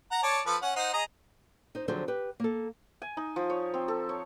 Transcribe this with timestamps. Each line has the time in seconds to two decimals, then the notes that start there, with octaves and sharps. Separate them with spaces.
0.11 F#5 A#5
0.23 C#5 D5 A5
0.46 F3 A4 B4
0.62 C#4 F#5
0.76 D#4 C5 F#5
0.93 G#4 D#5 A#5
1.75 D#4 C5
1.88 D3 F3 F#3 C4 G#4 C5
2.08 G4 B4
2.40 A#3 A4
3.02 G#5
3.17 D#4
3.36 F3
3.50 C#5
3.74 C4
3.88 A4
4.09 C#5